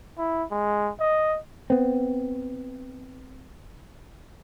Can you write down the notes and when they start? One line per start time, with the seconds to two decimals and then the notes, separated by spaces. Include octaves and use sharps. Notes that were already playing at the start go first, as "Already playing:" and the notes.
0.18 E4
0.51 G#3
1.00 D#5
1.70 B3 C4